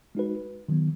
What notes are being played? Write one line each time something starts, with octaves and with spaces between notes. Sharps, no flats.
G#3 D#4 F#4 B4
D#3 F#3 B3